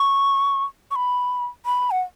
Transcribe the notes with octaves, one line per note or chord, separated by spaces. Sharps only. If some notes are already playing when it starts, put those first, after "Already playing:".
Already playing: C#6
C#6
B5
B5
F#5